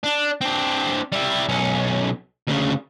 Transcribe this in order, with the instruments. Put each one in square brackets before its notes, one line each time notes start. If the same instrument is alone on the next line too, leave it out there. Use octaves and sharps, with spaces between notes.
[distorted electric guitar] D4
C4 D4
G3 E4
B1 C#4
D2 C#3